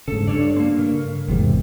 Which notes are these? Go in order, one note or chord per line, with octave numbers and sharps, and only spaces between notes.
G#2 C#3 A4
G2 A4 C#5 D5
A#3 C4
C#3 A#4
G1 E2 G#2 C3